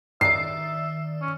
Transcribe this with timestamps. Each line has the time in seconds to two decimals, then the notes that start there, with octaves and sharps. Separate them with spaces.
0.21 D#3 D5 E5 C7
1.22 C#4